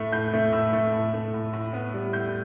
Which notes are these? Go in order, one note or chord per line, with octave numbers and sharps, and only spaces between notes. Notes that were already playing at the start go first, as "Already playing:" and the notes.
Already playing: A2 A3
A2 G6
A3
A2 E6
A3
A2
A3
A2
A2
B3
G3
A2 G6